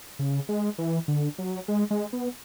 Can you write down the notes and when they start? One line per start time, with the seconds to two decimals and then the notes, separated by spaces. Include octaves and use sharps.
0.19 C#3
0.49 G#3
0.78 E3
1.08 D3
1.38 F#3
1.68 G#3
1.91 G#3
2.13 B3